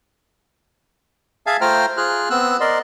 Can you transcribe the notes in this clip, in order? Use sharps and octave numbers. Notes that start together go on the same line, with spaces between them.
G#4 E5 F5 G#5 A5
A3 F4 C5 G5 A#5 F6
F4 G#4 F6 F#6
B3 C4 E6 F#6
A#4 D5 D#5 C6